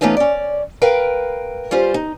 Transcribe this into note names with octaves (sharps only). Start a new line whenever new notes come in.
E3 A3 B3 C#4 D#4 F4
C#4 D5
A#4 B4 F5 G5
G3 C#4 F4 C5
D#4